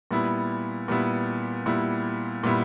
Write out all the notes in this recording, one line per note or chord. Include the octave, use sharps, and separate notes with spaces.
A#2 G3 B3 E4
A#2 G3 B3 E4
A#2 G3 B3 E4
A#2 G3 B3 E4